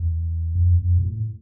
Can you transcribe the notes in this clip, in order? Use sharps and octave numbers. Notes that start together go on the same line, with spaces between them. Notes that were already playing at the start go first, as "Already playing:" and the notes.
Already playing: E2
F2
F2
A#2
A2